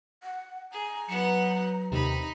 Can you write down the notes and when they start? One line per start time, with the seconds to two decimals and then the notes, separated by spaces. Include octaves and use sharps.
0.23 F#5
0.72 G#4 A#5
1.08 F#3 B3 F#5 C#7
1.91 D#2 C3 D#4 B5